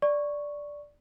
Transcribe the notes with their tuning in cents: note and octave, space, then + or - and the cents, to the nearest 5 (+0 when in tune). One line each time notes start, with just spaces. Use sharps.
D5 -5 C#6 +0